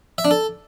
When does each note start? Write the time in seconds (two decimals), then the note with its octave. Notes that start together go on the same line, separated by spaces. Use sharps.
0.18 E5
0.25 D4
0.31 A4